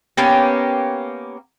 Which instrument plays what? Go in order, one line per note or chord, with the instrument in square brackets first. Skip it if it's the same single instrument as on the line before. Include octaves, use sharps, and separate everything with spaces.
[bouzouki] A#3 B3 C#4 G4